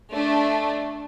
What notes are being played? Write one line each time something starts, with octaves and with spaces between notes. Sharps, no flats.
A3 D4